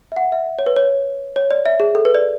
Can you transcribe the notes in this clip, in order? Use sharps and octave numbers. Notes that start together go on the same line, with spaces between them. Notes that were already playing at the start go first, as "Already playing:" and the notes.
E5
F#5
E5
C#5
B4
C#5
C#5
D5
E5
G#4
A4
B4
D5